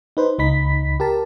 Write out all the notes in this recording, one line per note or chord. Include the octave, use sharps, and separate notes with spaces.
D#4 B4 C5
C#2 D#4 B5 B6
G4 A#4 A5